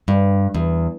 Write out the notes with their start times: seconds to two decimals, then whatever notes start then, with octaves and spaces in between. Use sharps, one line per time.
0.08 G2
0.55 E2